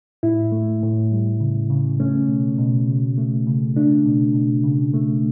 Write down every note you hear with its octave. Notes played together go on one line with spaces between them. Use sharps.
A2 E4
A3
A2
G3
C#3
C#3
A3 C#4
B2
B2
C#3
A3
C#3
A3 D4
B2
B2
C#3
A3